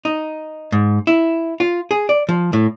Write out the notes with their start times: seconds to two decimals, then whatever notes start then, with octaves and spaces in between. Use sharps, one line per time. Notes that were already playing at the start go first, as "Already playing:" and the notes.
0.05 D#4
0.72 G#2
1.07 E4
1.60 F4
1.91 G#4
2.09 D5
2.29 F3
2.53 A2